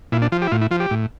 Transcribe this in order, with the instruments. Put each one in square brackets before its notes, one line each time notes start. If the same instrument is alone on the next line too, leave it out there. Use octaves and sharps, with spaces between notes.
[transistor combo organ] A#2 E4
D4
F3 F4
G4
E4
A2 F4
E4
F3 F4
G4
A2